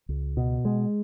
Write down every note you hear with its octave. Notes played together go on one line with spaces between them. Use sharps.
C#2
B2
G#3